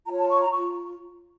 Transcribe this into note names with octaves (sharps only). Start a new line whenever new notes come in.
F4 C#5 A#5
A5
C#6
A#5
F4 C#6